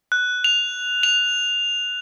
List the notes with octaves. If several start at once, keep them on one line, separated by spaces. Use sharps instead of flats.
F#6
F7
F7